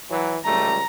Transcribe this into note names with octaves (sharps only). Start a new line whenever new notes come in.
E3 F#3
C#2 G3 A3 A#5